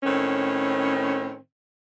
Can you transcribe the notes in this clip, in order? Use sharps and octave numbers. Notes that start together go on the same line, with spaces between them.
A2 D#3 C4 C#4